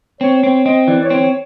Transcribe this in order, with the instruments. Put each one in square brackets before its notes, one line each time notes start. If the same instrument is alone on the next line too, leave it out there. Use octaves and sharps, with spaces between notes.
[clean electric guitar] C4 [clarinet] C#5
[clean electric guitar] C4 [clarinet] C#5
[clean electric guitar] C4 [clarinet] D#5
[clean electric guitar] E3 [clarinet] D5
[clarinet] C#5
[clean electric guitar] C4
[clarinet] C#5